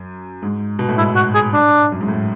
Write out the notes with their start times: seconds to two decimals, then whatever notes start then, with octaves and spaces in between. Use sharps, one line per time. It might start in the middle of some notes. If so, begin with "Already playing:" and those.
Already playing: F#2
0.42 G#2
0.79 B2
0.89 A2
0.98 G#2 E4
1.16 F#4
1.34 G#4
1.53 D4
1.92 F#2
2.01 G#2
2.08 A2